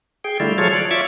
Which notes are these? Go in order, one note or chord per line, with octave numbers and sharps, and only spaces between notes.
G#4 G5
D3 G3 A3 E4 F4
F3 F#3 F4 G#4 A4 C#5
D5
F4 C#5 E5 C#6 D6 E6